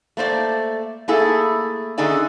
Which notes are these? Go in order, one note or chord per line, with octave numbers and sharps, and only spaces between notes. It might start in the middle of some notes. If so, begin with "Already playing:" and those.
A3 A#3 C5 D5
A3 A#3 E4 G#4 A4
D3 C#4 D#4 G#4 D5 E5